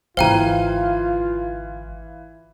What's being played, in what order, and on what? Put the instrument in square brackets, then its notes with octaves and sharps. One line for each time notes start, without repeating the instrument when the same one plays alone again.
[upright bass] G#1 D3 [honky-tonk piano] E3 F5 [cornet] F4 [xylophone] C5 G5 A#5